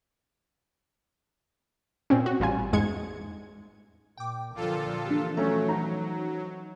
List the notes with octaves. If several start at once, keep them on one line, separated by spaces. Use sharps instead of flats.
A#2 C4 C#4
F#4
A1 G3 F4 G#5
E2 G#2 G#3 G#6 C#7
A#2 G5 D6
A#2 D3 F3 F4 A4
E3 F3 D4 G4
F#3 A3 C#4 A#5
D#4 A#5